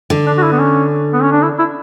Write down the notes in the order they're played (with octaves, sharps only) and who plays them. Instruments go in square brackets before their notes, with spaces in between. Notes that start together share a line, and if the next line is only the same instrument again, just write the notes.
[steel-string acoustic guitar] D3
[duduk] D4
F#4
E4
B3
C#4
B3
C#4
D4
E4
E4